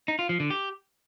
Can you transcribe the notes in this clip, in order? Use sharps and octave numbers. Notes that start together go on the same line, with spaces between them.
D#4
F4
F3
D3
G4